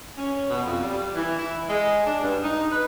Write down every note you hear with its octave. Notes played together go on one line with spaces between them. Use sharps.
C#4
B2
F2
G3
E3
E4
G#3
D4
G2
D#4
B4